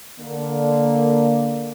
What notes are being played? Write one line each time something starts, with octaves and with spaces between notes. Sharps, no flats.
D3 A#3